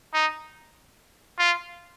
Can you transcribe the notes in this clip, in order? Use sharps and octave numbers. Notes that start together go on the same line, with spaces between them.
D#4
F4